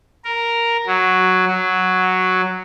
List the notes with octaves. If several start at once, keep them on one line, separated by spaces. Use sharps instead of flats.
A#4
F#3
F#3